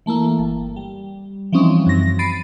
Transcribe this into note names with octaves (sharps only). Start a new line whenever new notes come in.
E3 A3 A#3 E4
G1
G3
E3 F3 G3 C4 C#4 D#4
F#2 A#6
B5 A6 C7 D7 D#7